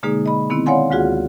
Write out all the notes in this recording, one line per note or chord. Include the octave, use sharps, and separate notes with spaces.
B2 D3 G#3 A#3 D#4 G#4
D#5 B5
D#3 B3 C4 E4
C#5 D5 F5 F#5 G#5 C6
D2 G#3 F4 F#4 G#4 F#5